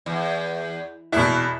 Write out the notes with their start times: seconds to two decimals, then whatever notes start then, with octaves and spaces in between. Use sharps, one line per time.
0.06 E2
1.12 E2 B2 E4